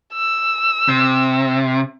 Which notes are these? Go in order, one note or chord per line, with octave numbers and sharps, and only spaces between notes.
E6
C3